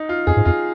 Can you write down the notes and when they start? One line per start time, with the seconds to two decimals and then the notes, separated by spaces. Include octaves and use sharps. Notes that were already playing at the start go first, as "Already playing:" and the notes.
Already playing: D#4
0.09 F4
0.27 F2 G#4
0.37 G#2
0.45 F2 F4